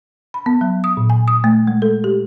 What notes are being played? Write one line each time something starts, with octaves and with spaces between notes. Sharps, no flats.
B5
B3
F#3
D#6
A#2
G#5
D#6
A3
G#3
A4
G4